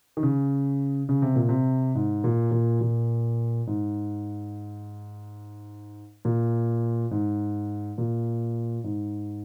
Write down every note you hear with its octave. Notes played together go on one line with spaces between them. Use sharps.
D#3
C#3
C#3
C3
A#2
C3
G#2
A#2
A#2
A#2
G#2
A#2
G#2
A#2
G#2